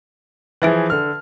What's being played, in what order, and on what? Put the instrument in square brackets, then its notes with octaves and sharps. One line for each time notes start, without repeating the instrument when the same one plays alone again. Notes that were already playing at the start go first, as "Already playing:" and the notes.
[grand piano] E3 F3 G#4 [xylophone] B4 E5 D7
[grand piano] D3 F6